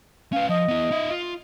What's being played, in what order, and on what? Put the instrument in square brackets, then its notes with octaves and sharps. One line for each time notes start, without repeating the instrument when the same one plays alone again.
[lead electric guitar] C#4 B4 [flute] F5
[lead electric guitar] F3 [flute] D#5
[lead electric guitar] B3 E4
D#4 E5
F4